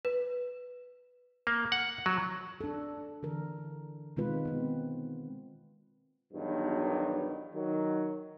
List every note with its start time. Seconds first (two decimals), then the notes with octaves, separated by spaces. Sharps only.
0.05 B4
1.47 A#3
1.72 F#5
2.06 F#3
2.61 D4 A4
3.23 D3 E3 A#4
4.17 B2 D#3 G#3 C4 F4 B4
4.45 B3 C4
6.33 E2 G2 B2 D#3 F#3
7.55 D#3 F#3